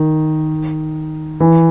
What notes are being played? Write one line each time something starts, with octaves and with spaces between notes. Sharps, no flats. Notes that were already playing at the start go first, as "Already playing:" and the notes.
Already playing: D#3
E3